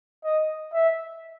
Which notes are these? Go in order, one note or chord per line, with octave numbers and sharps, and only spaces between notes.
D#5
E5